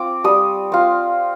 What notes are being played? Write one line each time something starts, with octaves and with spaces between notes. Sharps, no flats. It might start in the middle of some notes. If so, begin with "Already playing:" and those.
Already playing: C4 F4 D6
G3 D#6
C4 F4